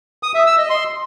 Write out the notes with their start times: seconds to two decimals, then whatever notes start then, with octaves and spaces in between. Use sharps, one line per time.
0.23 D#6
0.35 E5
0.46 E6
0.58 D#5
0.70 C6